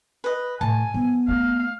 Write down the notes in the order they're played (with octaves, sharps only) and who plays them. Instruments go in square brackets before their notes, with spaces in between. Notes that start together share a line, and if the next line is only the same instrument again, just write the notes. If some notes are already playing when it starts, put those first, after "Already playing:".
[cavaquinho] B4 D#5
[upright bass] A2 [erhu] G#5 [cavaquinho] A5
[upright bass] F3 [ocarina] B3
[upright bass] A3 C#4 [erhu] F5